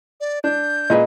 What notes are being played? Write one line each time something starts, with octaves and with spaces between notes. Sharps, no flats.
D5
D4 G6
A#2 G#4 B4 D#5